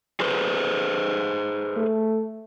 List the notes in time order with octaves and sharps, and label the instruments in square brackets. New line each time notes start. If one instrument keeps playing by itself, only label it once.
[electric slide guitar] G#4 B4 C5
[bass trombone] A3